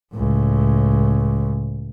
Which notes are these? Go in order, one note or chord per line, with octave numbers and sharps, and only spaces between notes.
C#2 A2